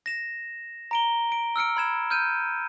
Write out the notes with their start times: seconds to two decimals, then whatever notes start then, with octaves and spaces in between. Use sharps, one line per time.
0.06 A#6 E7
0.91 A#5 D7 G7
1.32 D7
1.56 E6 F6 C#7 D7
1.77 B5 G#6 E7
2.10 F6 G6 D#7